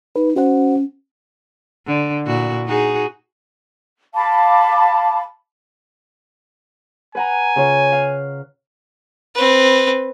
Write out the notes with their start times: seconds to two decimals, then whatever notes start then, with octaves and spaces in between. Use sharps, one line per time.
0.16 D#4 B4
0.36 C#4 F#4 C5 F#5
1.86 D3
2.26 A#2 E4 F#4
2.66 D#4 F#4 G#4
4.15 F5 A5 B5 D6
7.15 B4 F#5 G#5 A#5
7.56 C#3 F4 C#5
7.92 F5 F#6
9.35 C4 B4